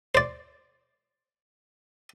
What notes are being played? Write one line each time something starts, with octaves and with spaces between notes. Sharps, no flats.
C5 D5